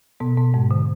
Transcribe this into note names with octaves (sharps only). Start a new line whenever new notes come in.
B2 B3
B2 B3
G#2 G#3
D3